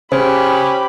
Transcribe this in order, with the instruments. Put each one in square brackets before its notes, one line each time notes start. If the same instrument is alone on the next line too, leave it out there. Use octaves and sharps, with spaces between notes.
[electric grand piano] C#3 [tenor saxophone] C#4 [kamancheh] G4 B5 [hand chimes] C5